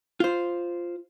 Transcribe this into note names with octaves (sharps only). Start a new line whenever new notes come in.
F4 C5